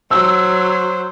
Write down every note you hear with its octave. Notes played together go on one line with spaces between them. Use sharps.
F#3 C5 E6